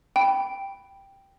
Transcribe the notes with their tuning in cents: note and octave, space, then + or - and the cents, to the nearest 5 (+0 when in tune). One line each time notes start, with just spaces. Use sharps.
G5 +0 B5 +0